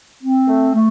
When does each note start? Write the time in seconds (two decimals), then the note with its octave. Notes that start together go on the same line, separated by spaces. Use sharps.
0.23 C4
0.48 A3
0.73 A3